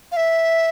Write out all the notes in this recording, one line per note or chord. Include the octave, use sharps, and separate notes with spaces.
F5
E5